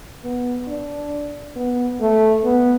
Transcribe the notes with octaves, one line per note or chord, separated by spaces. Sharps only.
B3
D4
B3
A3
B3